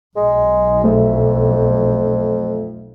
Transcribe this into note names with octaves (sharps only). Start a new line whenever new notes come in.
B1 G#3
F2 A3 A4 E5